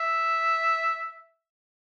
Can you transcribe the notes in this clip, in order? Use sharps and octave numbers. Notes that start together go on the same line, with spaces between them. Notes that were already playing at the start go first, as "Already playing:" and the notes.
Already playing: E5